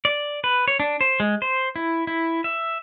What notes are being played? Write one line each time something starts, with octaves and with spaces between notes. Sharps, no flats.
D5
B4
C#5
D4
C5
G#3
C5
E4
E4
E5